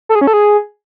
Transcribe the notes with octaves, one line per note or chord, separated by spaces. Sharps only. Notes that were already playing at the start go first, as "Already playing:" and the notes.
A4
G#4
C#4
A4
G#4